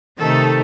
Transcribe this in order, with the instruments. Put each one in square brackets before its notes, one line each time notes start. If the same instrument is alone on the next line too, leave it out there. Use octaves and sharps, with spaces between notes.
[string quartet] C3 D#3 A3 D#4 [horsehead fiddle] A4